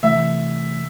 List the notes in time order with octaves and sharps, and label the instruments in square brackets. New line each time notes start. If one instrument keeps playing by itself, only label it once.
[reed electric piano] C3 E3 A3 [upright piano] E5